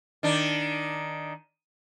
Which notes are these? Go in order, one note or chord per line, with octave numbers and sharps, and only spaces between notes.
D#3 D4